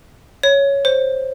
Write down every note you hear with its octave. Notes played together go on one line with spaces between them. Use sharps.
C#5
C5